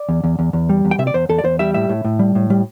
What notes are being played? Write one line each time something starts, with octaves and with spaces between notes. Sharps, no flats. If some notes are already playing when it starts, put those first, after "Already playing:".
Already playing: D5
E2
E2
E2
E2
G3
E2
G5
C3 E5
D5
E2 C5
E2 A4
D5
E2 C5
G3 E5
A2 E5
A2
A2
G3
A2
G3